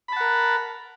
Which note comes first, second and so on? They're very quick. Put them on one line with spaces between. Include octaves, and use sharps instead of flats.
B5 A5 F#5 A#4